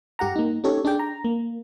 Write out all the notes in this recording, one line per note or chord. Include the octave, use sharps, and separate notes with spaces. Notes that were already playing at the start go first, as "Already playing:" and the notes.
G2 G4 F#5 A#5
A#3 D#4
C#4 D#4 G4 A4 C#5
D4 G#4 D5 G5
A#5
A#3